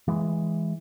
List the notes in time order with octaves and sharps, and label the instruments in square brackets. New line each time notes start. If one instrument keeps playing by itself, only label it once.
[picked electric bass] E3 G#3